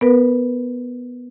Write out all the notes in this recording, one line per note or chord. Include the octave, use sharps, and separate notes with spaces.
B3 A#4 B4